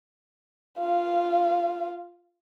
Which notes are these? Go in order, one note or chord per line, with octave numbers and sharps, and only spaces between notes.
F4 F5